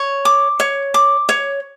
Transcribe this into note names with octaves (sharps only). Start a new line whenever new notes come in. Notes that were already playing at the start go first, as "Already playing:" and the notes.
Already playing: C#5
D6
C#5
D6
C#5